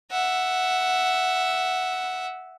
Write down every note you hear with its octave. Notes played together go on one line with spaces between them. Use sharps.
E5 F#5